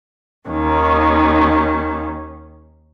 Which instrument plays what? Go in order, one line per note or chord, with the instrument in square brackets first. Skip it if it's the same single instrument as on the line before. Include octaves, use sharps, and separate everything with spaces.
[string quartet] D#2 D#3 C#4